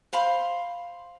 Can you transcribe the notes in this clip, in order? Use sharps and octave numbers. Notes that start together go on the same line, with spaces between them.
C5 F5 B5 C6